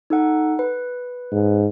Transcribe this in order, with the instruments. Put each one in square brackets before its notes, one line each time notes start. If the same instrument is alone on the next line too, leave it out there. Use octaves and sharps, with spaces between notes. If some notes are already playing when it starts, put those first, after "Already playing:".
[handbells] D#4 A4 F#5
B4
[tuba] G#2